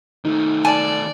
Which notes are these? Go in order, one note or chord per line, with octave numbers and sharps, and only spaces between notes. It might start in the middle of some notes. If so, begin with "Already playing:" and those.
D#3 A3 D#4
D5 G#5 A5